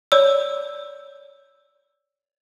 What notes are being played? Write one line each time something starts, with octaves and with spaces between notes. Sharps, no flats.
C#5 D5 E6